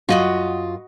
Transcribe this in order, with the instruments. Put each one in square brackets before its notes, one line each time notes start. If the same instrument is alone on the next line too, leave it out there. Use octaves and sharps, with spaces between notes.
[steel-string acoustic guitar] F#2 F4 [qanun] F#4 D#5 B5